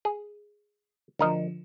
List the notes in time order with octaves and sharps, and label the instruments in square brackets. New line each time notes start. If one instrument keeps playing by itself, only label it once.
[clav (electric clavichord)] G#4
[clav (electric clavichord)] D2 A#4 D#5 [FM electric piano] D3 F3